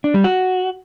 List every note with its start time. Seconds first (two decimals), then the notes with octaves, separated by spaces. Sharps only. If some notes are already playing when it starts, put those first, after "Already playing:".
0.04 D4
0.14 G3
0.24 F#4